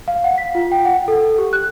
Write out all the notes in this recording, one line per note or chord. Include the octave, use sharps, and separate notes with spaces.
F5
F#5
B6
F4
G5
F#5
A4
G4
F#6